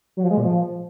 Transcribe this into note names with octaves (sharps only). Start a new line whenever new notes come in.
F#3
F3
G#3
A#2
F3